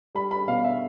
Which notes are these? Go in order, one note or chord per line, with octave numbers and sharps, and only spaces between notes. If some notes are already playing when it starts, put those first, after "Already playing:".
G3 B5
B5
B2 F5
E5